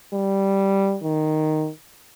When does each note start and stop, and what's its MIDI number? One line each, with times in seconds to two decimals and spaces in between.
0.14 0.98 55
1.04 1.70 51